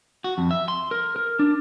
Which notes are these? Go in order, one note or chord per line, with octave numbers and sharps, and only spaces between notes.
F#4
F2
E5
C6
A#4
A#4
D4